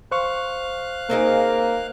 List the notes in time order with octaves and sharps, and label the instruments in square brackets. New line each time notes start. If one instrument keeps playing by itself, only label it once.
[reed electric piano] C5 C#6 [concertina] F5 F#6
[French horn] A#3 [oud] C4 D#4 G#4